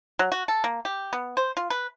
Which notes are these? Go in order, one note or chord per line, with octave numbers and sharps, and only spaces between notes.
F#3
F#4
A4
A#3
G4
B3
C5
F4
B4